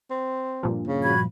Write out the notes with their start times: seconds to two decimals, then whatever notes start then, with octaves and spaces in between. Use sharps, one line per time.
0.11 C4
0.63 G2 A#2 F3
0.87 C#3
1.03 F#4 B5 G#6